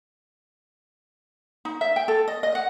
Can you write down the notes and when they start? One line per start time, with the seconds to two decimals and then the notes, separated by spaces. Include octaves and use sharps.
1.65 D#4
1.81 E5
1.96 G5
2.08 A4
2.28 D#5
2.43 D#5
2.55 F#5